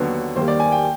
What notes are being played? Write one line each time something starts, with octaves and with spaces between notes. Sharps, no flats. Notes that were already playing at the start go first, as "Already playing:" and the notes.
Already playing: D#2 D3 F#3 B3
D#2 D#3 G3 A#3 C5
D5
G#5
G5